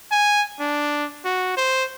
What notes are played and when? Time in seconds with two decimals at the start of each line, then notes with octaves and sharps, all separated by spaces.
0.11 G#5
0.60 D4
1.25 F#4
1.57 C5